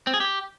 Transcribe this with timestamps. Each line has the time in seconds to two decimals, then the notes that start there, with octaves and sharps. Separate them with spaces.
0.07 C4
0.14 G#4
0.20 G4